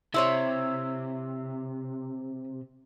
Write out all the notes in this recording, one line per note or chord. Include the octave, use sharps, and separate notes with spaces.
C3 E4 C5 C#5